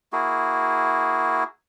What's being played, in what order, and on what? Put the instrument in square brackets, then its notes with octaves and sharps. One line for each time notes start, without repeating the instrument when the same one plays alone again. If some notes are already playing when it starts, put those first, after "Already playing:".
[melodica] A#3 E4 F#4 G#4